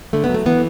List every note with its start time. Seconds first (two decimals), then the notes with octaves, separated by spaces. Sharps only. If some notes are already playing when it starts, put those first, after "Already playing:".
0.13 D3 A3
0.24 B3
0.29 F#3 A3
0.46 E3 B3